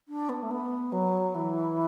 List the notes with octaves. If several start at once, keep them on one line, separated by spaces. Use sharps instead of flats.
D4
B3
A3
B3
F#3
E3